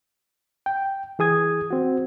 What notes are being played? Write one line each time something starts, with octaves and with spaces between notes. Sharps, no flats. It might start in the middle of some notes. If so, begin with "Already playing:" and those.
G5
E3 G#4 D#6 G#6
C4 F#4